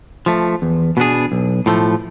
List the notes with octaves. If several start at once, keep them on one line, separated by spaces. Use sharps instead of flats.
F3 A3
E2
B2 B3 D4 G#4
B1
A2 F3 A3